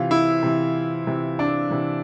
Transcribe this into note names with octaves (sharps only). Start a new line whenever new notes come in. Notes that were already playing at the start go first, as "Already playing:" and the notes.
Already playing: C3 E3 F4
E4
C3 E3
C3 E3
D4
C3 E3